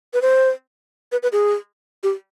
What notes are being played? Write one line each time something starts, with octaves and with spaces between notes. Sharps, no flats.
B4
C5
B4
B4
G#4
G4